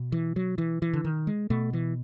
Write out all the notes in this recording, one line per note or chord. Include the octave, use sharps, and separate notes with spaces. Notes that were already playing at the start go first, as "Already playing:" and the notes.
Already playing: B2
E3
F#3
E3
E3
D3
D#3
G#3
B2 A3
E3